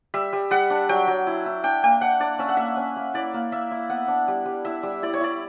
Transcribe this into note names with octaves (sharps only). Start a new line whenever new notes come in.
G3 E5
G3
G3 F#5
D4
F#3 G5
F#3
E4
E4
D4 G5
A#3 G5
D4 F#5
D4 D5
C#4 E5
F#5
A#3 E5
C#4
A#3
E4 D5
A#3
A#3 E5
E4
B3 F#5
D4
G3
G3
E4 E5
G3
E4 D5
C#5
E4 D5